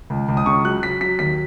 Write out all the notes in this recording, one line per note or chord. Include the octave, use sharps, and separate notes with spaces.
C#2
C#2
D#6
C#3 C#6
F#3 F#6
F#3 B6
F#3 B6
D#2 B6